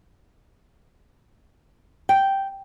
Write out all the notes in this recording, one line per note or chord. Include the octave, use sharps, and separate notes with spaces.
G5